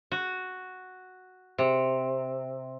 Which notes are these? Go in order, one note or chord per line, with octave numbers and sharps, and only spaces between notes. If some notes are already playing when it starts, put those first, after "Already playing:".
F#4
C3